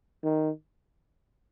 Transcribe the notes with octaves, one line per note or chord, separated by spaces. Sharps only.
D#3